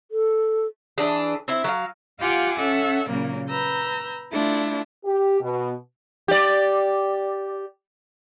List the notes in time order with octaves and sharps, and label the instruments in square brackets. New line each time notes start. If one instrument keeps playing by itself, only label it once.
[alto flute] A4
[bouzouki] E3 D4 G#4
C4 E4
F#3 F5
[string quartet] F4 G4 F5 F#5 G#5 D6
C#4 A4 E5 F#5
A#2 C#3 F#3 A#3
B4 A#5 E6 G6
A3 D4 E4 F4
[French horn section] G4
B2
[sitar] G4 D5